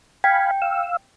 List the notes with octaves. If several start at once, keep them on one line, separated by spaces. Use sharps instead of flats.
F5 G5 G#5 B5
F5 E6